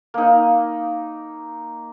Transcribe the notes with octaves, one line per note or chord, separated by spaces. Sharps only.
A#3 D#4